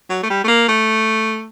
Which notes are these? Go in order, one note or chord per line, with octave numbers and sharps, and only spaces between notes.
F#3
A3
G3
A3
A#3
A3